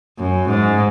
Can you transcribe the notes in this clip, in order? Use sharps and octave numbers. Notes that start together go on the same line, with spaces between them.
F#2
G#2